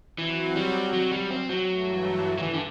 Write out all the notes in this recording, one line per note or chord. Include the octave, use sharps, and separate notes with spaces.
E3 F#3 C4 F#4
G3
F#3
G3
C4
F#3
G2 E3 A3
F#3
E3
D3